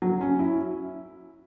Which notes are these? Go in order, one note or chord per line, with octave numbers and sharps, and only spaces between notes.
F#3
C#4
E4